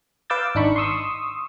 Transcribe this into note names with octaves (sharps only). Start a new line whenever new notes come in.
B4 F5 D6 E6 G6 A6
G#1 D4 D#4 B5 C#6
C6 C#6 D#6 E6